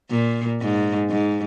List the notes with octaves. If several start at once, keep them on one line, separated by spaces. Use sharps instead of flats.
A#2
G#2
G#2